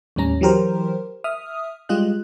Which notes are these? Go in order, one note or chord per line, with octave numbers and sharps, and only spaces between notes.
D#2 A2 G3 C#4 A#5
E3 F#3 G4 A#4 C5
E5 D#6 F6
G3 G#3 F4 G4 D#5 F#6